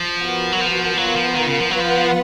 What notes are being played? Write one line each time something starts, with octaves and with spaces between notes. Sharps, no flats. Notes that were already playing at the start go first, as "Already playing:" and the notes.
Already playing: F3
B3 F#4 A#4
F#3
F3
F#3 B3 F4 A#4
F3
D#3
C#3
F3
F#3 B3 F4 B4 F#5
F3